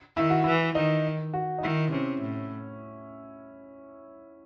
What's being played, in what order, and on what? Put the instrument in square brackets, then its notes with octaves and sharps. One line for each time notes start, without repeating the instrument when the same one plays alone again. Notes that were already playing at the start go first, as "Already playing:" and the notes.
[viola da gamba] D#3 [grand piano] E4
[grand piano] F#4
[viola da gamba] E3 [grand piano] E4
[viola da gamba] D#3 [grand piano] D#4
[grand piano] F#4
D#4
[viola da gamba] D#3 [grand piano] E4
[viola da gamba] C3 [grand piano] C#4
[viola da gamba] A2